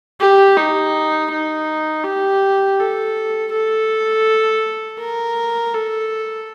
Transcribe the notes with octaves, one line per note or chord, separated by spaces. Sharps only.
G4
D#4
D#4
G4
A4
A4
A#4
A4